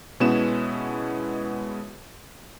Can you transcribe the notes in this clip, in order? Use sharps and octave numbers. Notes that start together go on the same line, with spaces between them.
B2 G#3 B3 C#4 E4 E7